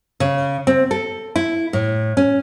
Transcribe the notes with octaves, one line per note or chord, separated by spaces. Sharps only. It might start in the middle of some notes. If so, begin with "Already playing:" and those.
C#3
C4
A4
E4
A2
C#4